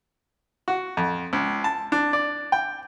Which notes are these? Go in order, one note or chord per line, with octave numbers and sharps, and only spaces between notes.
F#4
F2
C#2
A5
D4
D5
G5